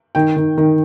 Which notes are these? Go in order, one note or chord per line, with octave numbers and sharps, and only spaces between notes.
D#3 G5
D#3
D#3